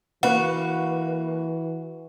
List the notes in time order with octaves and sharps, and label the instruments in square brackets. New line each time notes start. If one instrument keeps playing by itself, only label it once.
[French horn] E3 [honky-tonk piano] A#3 B4 F5 [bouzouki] F#4